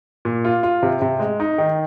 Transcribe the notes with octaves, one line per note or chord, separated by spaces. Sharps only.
A#2
F4
F4
C3
C3
G#3
D#4
D#3